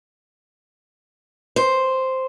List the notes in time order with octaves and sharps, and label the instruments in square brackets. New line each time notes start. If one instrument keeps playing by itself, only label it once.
[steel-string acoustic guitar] C5